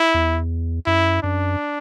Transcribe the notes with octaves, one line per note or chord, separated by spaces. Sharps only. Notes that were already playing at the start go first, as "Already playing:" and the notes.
Already playing: E4
E2
F#2 E4
F#2 D4